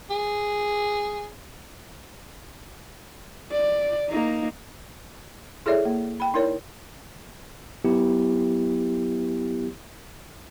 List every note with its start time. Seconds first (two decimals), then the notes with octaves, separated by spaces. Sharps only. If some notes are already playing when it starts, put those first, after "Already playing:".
0.10 G#4
3.52 D5
4.09 A#3 D#4
5.66 E4 G#4 A4 C#5 D5 E5
5.85 A#3
6.20 G5 B5
6.34 D#4 E4 A#4 C#5 D5
7.85 F#3 B3 E4 G4